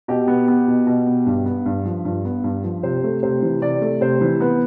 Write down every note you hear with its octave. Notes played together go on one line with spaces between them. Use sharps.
B2 G4
B3
B3
B2
B2
B3
G2
B3
G2
F3
G2
B3
G2
F3
C3 C5
A3
C3 C5
E3
C3 D5
A3
C3 C5
E3
B3 B4